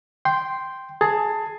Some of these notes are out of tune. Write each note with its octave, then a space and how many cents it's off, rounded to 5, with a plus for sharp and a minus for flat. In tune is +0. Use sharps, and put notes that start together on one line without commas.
G5 +0 C6 +0
G#4 +15 A5 +20